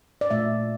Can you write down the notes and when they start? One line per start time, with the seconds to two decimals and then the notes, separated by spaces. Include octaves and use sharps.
0.21 D5
0.30 A#2 A3 E5